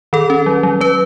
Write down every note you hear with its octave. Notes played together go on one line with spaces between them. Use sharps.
D#3 A4
C#4
F#3
F#3
F#3 B4